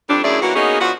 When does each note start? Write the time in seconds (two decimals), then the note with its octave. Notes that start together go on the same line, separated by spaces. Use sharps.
0.10 F2 G3 D4
0.24 F#2 A2 D4 E4 G#4 D5
0.42 E3 A#3 C#4 F#4
0.55 A#3 B3 C#4 D#4 F#4 G#4
0.80 F3 B3 D4 F#4